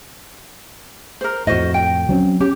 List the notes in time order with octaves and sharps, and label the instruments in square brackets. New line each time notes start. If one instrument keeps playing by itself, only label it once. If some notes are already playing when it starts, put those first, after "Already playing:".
[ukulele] A#4 C5
[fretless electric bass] F2 A2 [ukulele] F#4 C5 D#5
[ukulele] G5
[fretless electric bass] F#3 C4 C#4
[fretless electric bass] C#4 [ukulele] G4